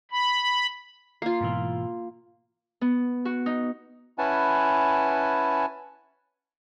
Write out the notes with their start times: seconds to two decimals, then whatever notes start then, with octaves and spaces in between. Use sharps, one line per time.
0.11 B5
1.22 A#3 F4 C7
1.41 G#2 B2 E3
2.81 B3
3.25 F#4
3.46 D#4
4.18 C#4 E4 B4 F#5 G#5 A5